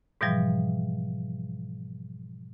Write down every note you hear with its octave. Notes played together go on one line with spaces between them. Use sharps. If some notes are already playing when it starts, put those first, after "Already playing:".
G#2 B2 E3 F3 G3